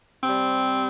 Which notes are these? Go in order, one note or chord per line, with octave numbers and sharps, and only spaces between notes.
C3 C4
G3